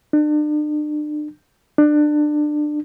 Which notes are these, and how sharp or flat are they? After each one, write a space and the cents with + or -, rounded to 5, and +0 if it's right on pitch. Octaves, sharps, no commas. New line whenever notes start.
D4 +40
D4 +25